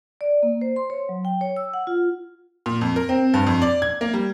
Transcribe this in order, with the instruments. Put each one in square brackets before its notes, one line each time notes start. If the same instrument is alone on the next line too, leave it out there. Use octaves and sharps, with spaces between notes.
[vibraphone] D5
A#3
C5
C6
C#5
F#3
G5
C#5
E6
F#5
F4
[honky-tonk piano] A#2
F2
A#4
C4
G2
F2
D5
G#6
A#3
G3